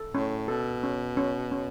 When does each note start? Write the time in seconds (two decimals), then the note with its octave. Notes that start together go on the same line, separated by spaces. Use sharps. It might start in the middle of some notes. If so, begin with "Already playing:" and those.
Already playing: A4
0.14 A2 C#4
0.48 B2 A4
0.83 C#4
1.17 C#4
1.52 C#4